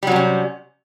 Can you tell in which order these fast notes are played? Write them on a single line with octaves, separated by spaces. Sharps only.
G3 F#3 C3 C#4